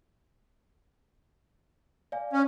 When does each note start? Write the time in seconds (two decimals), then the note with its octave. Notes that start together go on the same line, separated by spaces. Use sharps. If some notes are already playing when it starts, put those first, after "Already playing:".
2.12 D5 F5 G#5
2.33 C#4